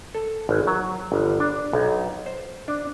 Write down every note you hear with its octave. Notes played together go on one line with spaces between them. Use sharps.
A4
G#1
F#3
G1
D4
B1
C5
D4